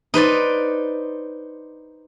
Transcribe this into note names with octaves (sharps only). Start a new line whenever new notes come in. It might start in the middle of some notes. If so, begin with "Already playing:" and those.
D#4 B4 C5 D5